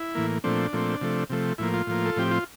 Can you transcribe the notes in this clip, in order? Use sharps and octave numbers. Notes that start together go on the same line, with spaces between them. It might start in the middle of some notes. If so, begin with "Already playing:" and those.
Already playing: E4
A2 E3 A#3
A#2 F3 A3 C4 D4
A#2 F3 A3 C4
C3 F3 A3
C3 F3 A3
A2 F3 A#3 E4
F4
A2 F3 A#3
A4
A2 F3 C4 G4
F4